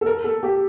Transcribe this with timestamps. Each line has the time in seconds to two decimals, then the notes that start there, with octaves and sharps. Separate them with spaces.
0.01 A4
0.06 A#4
0.24 A4
0.43 G4